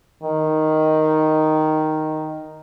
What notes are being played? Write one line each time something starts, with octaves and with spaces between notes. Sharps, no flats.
D#3